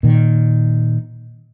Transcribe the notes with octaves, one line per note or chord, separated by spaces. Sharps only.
A#2 D#3